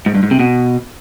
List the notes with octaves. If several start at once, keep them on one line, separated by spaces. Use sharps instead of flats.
G#2
G2
G#2
C3
B2